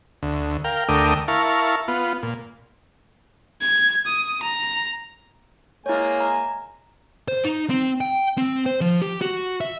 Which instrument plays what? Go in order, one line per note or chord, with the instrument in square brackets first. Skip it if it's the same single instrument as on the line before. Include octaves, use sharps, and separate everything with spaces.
[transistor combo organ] D2
A#4 F5 G5
D2 A3 A#4 G5 D6 D#6
E4 A#4 F5 A5 C#6
B3 F4
A#2
[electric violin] G#6
D#6
A#5
[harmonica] G#3 A#3 G#5 [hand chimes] E4 C#5
[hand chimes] A#5
[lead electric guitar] C5
D#4
C4
G5
C4
C5
F3
G4
F#4
E5